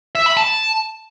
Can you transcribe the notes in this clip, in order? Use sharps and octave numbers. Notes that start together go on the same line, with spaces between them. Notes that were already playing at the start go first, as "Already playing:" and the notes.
E5
B5
A5